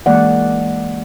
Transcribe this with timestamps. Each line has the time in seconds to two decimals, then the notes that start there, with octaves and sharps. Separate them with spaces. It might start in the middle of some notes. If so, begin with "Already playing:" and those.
0.06 E3 G#3 A#3 D5 F#5